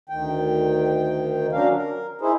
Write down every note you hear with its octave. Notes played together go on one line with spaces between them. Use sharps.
D2 D#3 G5
F#3 C#4 D4 A#4 F5
A#4
D#4 E4 G#4 C5